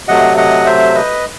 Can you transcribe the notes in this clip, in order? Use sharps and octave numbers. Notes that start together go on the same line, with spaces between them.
C3 F#3 A3 D#5 F#5
D#5 F#5
C5 E5
B4 D#5